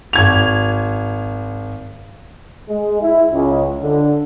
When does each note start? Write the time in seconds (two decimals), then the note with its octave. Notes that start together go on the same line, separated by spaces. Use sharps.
0.13 G#1 G#6 F7
2.69 G#3
3.01 E4
3.33 C#2
3.82 D3